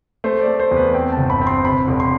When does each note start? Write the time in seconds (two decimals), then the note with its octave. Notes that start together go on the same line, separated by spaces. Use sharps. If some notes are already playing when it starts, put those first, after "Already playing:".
0.24 A3 C5
0.41 D5
0.47 A3
0.60 C5
0.71 E2
0.76 B4
0.94 C4 G5
1.12 A5
1.17 G1
1.30 B5
1.41 C4
1.47 C6
1.64 C3 B5
1.87 E1
2.00 C6